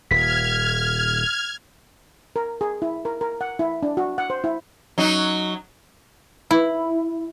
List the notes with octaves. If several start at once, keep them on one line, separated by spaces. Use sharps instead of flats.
D#1 F6 G#6 B6
A#4
G#4
E4
A#4
A#4
F#5
E4
D4
F#4
F#5
C5
E4
F#3 D#4
E4